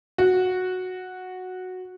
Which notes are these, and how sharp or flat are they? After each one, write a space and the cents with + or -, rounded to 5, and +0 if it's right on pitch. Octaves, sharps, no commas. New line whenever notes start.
F#4 -5